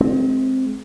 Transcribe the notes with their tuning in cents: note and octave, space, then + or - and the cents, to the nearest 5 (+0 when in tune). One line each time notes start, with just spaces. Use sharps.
G#3 +30 C4 +0